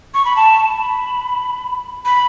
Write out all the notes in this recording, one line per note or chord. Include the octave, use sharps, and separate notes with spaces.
C#6
B5
A5
B5
B5